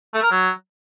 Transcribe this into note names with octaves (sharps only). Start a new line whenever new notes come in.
A3
A#4
F#3